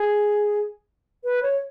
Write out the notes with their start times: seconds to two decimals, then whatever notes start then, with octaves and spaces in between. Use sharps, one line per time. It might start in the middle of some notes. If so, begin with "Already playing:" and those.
Already playing: G#4
1.24 B4
1.43 C#5